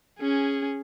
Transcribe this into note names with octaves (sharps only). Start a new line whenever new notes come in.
C#4 G#4